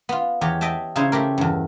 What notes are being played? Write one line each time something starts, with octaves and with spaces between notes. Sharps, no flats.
B3 F4
E2 G4 C#5
D#5 E5 G5 A5
C#3 D#4 E4 C5 C#5
A3 E4 G4 A#4
E2 G2